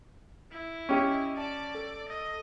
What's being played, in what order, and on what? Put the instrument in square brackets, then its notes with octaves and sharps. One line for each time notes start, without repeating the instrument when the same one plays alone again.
[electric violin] E4
[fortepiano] C#4 G4 [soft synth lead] D#5
[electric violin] D5 D6 [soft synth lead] A5
[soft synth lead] A4
[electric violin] D#5